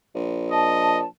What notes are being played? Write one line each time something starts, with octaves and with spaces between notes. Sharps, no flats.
A#1
D#5 A5